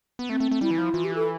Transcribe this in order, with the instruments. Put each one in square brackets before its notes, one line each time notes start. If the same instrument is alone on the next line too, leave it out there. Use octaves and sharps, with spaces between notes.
[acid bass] B3
[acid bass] A3 [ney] C4
[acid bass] A3
A3
[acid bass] G3 [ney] E4
[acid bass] E3
F3
[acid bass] E3 [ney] F4
[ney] G4
A4